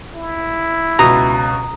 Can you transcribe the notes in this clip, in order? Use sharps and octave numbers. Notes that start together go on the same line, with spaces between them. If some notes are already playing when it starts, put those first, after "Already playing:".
E4
C#2 B2 A#5 D#6